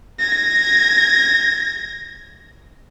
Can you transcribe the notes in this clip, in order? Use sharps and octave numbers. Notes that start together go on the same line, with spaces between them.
G#6 A#6